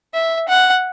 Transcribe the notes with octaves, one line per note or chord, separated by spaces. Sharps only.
E5
F#5